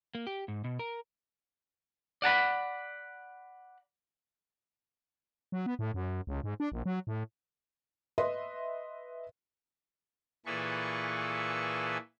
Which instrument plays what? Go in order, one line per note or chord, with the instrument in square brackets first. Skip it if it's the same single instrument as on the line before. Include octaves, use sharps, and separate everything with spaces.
[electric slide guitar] A#3
G4
G#2
B2
A#4
[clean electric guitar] D5 F#5 A5 B5
[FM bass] F#3
B3
A2
F#2
C#2
G#2
D4
A#1
F#3
A2
[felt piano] B4 D#5 E5 C6
[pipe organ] A#2 E3 G#4 A4 B4 C#6